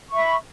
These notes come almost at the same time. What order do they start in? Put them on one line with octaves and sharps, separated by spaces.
C#6 E5 B5